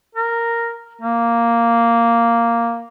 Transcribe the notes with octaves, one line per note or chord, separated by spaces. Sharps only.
A#4
A#3